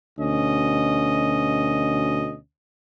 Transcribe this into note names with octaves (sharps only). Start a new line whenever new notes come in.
D2 B2 C#4 D#5